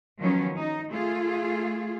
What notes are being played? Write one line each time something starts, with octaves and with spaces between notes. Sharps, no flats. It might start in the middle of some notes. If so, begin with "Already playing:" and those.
D#3 F3 F#3 B3 C#4
D#4
A3 F4 G#4